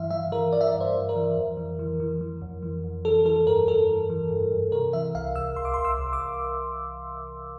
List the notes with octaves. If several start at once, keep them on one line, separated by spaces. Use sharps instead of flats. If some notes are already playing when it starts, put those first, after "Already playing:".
Already playing: G2 E3 E5 F5
E3 E5
E3 A#4
E3 D5
E5
D5
G2
C5
E3
A#4
E3
F2
E3
E3
E3
E3
F2
E3
F2
E3 A4
E3 A4
G2 A#4
G2 A4
E3
E3
G2
G2
C3 A#4
E3 E5
C2 F5
C2 E6
C2 C6
D6
C2 C6
E6
C2
D6